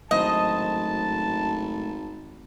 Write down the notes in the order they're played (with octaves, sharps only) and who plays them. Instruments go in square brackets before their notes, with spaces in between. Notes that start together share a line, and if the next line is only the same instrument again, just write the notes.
[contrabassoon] G#1 [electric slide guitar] F#2 A2 C5 [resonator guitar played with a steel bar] D#5 [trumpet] A5